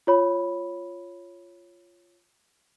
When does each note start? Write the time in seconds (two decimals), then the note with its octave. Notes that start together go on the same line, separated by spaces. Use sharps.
0.07 F4 C#5 B5